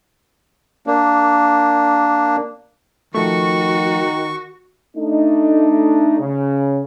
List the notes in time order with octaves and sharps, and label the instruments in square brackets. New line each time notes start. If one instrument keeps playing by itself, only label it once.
[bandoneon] A#3 D4
[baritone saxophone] D#3 [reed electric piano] F3 A3 [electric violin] F#4 [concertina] C#6
[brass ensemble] A3 D4 D#4
C#3